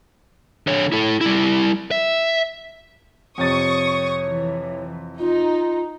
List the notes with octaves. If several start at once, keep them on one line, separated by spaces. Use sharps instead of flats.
D3 C#5
E4 A4
G3 E4
E5
F2 C3 C#5 C#6 D#6 A6
E3
D#4 F4